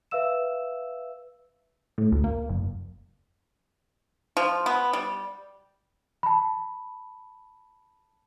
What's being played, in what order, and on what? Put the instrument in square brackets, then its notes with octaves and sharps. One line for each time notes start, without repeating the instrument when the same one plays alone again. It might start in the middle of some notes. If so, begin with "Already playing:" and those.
[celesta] B4 E5 F5 E6 E7
[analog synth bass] A2
D2
A#3
F#1
[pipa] F3
B3
G3
[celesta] A5 B5